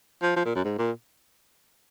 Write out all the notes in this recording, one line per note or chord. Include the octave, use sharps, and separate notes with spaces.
F3
F3
A#2
F#2
G#2
A#2